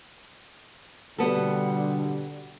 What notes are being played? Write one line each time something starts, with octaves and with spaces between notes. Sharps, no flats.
B2 D3 G3 B3 A4